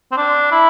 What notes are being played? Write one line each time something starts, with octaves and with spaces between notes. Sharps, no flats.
C4
D4
E4